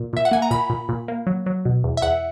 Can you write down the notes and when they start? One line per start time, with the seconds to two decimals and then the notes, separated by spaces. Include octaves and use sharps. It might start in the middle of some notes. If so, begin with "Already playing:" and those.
Already playing: A#2
0.13 A#2 E5
0.25 F#5
0.31 A#3 G#5
0.42 A#5
0.51 A#2 B5
0.70 A#2
0.89 A#2
1.08 A#3
1.27 F#3
1.46 F#3
1.65 B2
1.84 E2
1.97 E5
2.02 E2 F#5